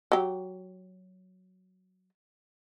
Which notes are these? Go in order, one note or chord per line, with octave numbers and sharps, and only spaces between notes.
F#3 G4